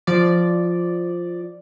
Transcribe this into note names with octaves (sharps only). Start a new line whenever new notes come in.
F3 D5